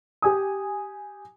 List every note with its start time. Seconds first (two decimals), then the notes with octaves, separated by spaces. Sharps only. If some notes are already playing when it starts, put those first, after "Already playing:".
0.22 G4 G#5 D#6